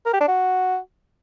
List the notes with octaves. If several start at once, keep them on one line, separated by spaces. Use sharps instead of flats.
A#4
G4
D4
F#4